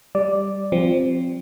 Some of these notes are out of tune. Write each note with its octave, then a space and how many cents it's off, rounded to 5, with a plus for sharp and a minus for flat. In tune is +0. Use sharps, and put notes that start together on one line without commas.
G3 +0 D5 +0
F3 +0 C4 +0